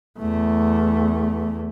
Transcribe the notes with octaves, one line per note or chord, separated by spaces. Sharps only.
E2 A3